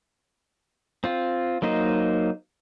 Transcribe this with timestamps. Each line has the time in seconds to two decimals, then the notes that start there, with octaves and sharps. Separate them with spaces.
1.04 C4 F4
1.62 F#3 A#3 D#4 C5 D#5